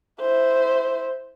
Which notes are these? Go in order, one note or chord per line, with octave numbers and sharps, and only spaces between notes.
E4 C5